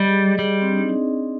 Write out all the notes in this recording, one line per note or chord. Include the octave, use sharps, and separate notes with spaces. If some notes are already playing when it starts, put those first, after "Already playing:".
Already playing: G3 D5 D#5
G#4
G3 G#4
C4
D4
D#4